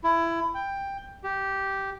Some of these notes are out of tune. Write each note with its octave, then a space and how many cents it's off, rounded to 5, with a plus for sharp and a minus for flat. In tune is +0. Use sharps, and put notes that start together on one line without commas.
E4 +20
G5 +10
G4 -10